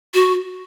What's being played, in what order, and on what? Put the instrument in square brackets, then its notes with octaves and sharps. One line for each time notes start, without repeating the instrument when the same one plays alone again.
[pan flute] F#4